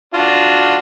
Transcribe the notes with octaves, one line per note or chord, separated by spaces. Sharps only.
D4 F4 F#4